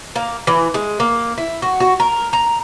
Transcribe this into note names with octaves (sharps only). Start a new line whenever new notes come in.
A#3
E3
G#3
A#3
E4
F#4
F#4
A#4
A#5